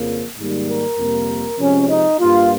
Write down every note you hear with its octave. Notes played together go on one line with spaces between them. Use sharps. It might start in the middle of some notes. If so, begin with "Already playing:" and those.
Already playing: F2 C#3 F3 A#3
G#2 D#3 G3 A#3
A#4
F2 C3 G3 A#3
C3 F3 G#3 C#4
D#4
G2 G3 A#3 F4